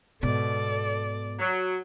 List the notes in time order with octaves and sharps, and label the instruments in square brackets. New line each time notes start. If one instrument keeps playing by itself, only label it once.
[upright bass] G#2 B2 [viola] A4 D5
[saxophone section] F#3